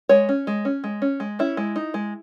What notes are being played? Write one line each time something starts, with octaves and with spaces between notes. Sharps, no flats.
G#3 C#5
C#4
G#3
C#4
G#3
C#4
G#3
C#4 E4
G#3
D#4
G#3